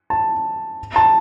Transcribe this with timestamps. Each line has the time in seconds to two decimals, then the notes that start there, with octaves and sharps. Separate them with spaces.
0.10 A5
0.96 A5